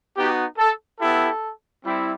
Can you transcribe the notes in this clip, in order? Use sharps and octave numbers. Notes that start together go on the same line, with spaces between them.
B3 D#4 F#4 G4
A4
B3 E4 G4 A4
G3 C4 E4